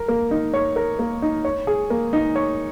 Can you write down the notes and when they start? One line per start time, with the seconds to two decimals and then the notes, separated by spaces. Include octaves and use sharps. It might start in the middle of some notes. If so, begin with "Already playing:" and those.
Already playing: A#4
0.08 A#3
0.31 D#4
0.54 C#5
0.76 A#4
0.99 A#3
1.22 D#4
1.45 C#5
1.67 G#4
1.90 A#3
2.13 D#4
2.36 C#5